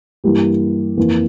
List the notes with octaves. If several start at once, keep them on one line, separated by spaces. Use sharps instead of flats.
G2 E3 A#3 E4 G4
F2 E3 A#3